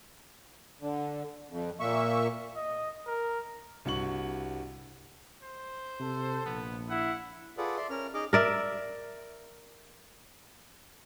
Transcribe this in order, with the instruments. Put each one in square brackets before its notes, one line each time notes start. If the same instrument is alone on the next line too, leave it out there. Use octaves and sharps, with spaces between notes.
[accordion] D3
F2
A#2 A#3 E5 C#6
[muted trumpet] D#5
A#4
[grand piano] C2 G2 F#4 C#6 F#7
[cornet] C5
[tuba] C3 [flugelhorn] A4
[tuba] A#1 [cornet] B3
[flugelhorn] E4 [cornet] F#5
[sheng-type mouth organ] F4 G#4 A4 B4 D5 F#5
D5 E5 C6
C#4 A#4 F6
D#4 G#4 D#5 D6 F6
[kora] A#4 D5 E5